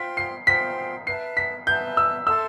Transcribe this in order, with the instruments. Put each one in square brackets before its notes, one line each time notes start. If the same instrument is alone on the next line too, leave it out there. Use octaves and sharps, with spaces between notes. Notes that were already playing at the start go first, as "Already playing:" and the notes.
Already playing: [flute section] F4 C5 G5 C6 [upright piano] B6
[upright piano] C7
[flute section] F4 C5 G5 C6 [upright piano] B6
[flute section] B4 E5 A5 [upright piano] C7
[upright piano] B6
[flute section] B4 E5 A5 [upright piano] G6
[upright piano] E6
[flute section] A4 E5 A5 C6 [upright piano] E6